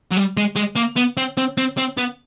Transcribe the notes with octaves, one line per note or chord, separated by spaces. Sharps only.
F#3
G3
G#3
G#3
A#3
B3
C4
C4
C4
C4
B3